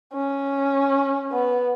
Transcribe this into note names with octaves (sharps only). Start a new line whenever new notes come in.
C#4
B3